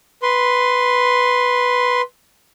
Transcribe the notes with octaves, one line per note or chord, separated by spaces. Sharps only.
B4 C6